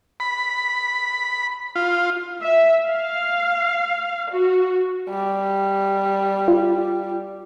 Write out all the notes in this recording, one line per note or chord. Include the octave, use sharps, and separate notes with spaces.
B5
F4
E5
F5
F#4
G3
F4